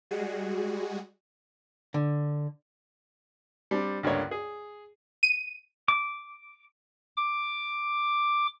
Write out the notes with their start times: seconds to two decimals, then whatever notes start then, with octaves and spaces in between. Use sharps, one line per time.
0.11 G3 G#3 F#4 G#4
1.94 D3
3.71 G3 C4 D4
4.03 C#2 G2 D3 A#3 C#5 D5
4.31 G#4
5.23 D#7
5.88 D6
7.17 D6